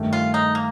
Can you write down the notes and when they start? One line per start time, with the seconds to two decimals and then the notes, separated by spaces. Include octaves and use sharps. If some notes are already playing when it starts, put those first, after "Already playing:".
Already playing: G2 D#3 A3
0.13 F4
0.34 D#4
0.55 A#3